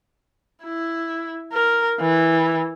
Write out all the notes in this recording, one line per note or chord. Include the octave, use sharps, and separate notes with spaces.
E4
A#4
E3